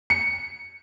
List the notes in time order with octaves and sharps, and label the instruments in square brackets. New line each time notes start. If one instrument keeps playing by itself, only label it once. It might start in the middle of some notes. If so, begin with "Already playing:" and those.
[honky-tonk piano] C#7